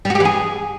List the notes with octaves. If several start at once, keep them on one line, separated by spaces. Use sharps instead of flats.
G3
F#4
G4
E3
G#4